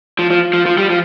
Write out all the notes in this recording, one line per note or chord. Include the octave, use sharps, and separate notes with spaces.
F3
F3
F3
F3
G3
F3